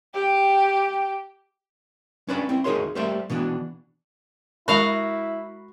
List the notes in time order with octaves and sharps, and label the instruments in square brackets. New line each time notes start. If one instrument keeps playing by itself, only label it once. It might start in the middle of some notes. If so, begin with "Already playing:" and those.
[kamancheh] G4 G5
[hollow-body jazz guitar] C#4 D4 B4 D5 B5
C4 E4
D2 D#4 G#4 A#4 C#5 C6
G3 A3 A#3 C5 D5 E5
B2 E3 B3 D4
[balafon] G#3 A#4 [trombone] E4 [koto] F#4 F5 A#5 [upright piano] B5